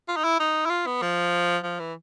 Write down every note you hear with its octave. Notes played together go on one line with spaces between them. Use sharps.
F4
D#4
E4
D#4
E4
F4
B3
F3
F3
E3